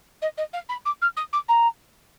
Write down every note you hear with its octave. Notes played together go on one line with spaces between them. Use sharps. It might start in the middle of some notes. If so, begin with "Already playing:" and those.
D#5
D#5
F5
B5
D6
F6
D#6
D6
A#5